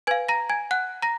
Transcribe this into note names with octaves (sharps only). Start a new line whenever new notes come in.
B4 F5 G#5 G#6
A#5 A#6
G#5 G#6
F#5 F#6
A#5 A#6